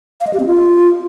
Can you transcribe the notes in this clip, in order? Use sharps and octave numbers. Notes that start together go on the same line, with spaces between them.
F5
D#5
G4
C4
F4